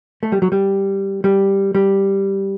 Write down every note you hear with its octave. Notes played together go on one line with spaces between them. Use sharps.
A3
G3
F#3
G3
G3
G3